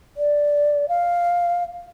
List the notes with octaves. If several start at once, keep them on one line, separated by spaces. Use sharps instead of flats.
D5
F5